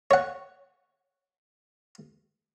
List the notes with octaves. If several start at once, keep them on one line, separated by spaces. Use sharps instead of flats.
C#5 F#5